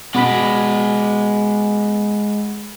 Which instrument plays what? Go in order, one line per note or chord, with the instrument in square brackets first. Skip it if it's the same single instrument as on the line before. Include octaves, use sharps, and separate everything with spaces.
[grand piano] B2 [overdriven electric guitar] G#3 D5 [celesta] F#5 B5 B6